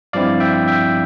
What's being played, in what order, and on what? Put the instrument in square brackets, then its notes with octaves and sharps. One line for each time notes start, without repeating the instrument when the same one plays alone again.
[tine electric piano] G2 F3 C4 E4 D5 F5
E5 G5
E5 G5